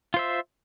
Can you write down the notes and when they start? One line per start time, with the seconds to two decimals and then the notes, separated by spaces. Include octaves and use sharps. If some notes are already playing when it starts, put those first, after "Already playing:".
0.14 F4
0.16 C5
0.19 E5